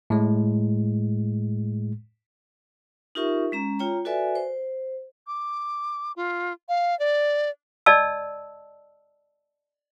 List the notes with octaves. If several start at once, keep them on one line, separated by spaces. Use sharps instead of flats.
A2 G#3
D#4 F4 G4 A#4 E5 C#6
G#3 C#4 A#5
F4 C#5 G5 A#5
F#4 A4 B4 D5 E5 G#5
C5
D6
F4
F5
D5
D5 D#5 A5 E6